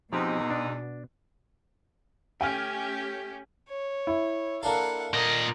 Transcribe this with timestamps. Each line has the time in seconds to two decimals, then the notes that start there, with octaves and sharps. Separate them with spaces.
0.13 E2 G#2 B2 F3 C4 D#4 G4
0.50 D4
2.41 A3 C#4 G4 G5 G#5 F6
3.68 C#5
4.07 E4
4.63 A#3 D4 A4 F5 F#5
5.14 A#2 A#4 D#5